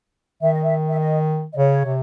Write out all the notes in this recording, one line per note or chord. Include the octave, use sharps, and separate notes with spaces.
D#3 E5
D#5
E5
E5
D#5
D#5
C#3 C#5
C3